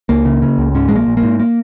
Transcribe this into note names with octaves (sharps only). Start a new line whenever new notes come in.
C#2 A#3
C#3
C#3
C#2
G#2 C#4
A#1 G#3
A#3
A#1
A#3
G#2
A#3